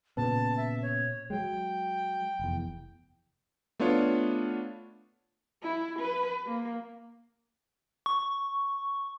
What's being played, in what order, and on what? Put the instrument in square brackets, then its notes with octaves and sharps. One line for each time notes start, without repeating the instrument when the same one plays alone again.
[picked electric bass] A#2 C#3 B3 [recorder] A5
[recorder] E5
C#5
[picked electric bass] F#3 G#3 [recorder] G5
[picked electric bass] F1 E2
[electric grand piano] A3 B3 D4 F4 C#5
[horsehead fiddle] E4
B4
A#3
[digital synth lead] C#6